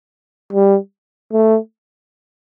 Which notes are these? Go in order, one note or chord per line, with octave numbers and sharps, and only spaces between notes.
G3
A3